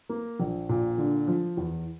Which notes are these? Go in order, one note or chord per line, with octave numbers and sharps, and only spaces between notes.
A#3
A#1
A#2
D3
F3
E2